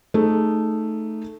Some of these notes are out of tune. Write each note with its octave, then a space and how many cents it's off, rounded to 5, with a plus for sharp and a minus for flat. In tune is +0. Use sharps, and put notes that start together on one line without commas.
A3 +0 D#4 -5 G#4 +0